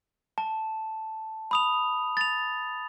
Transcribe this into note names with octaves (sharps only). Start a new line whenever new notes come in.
A5
B5 D#6 F7
A6 F7